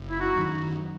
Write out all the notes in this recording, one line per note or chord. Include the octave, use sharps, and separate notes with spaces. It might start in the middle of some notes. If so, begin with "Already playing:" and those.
Already playing: F#1
E4
D#4 F#4
F#2 D#3